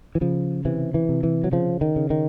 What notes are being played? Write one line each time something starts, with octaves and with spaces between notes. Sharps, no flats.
E3
C#3 F3
C3 E3
E3
C3
E3
F#3
C#3 F3
D#3
C#3
D#3